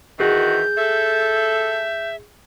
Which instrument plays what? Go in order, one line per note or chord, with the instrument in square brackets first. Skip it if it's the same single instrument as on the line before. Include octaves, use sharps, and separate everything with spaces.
[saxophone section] D#3 E3 F#4 [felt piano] G#4 [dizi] G6
[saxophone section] A4 [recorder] E5